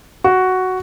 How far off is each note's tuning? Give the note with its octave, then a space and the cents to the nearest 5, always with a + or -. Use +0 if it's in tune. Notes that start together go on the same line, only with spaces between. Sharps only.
F#4 +5